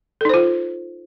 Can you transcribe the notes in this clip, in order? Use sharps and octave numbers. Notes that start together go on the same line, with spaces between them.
D#4 F4 A4 C5